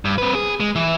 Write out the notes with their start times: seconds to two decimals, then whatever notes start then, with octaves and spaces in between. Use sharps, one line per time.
0.05 G2
0.18 C4 B4
0.35 G#4
0.60 G#3
0.75 E3 E4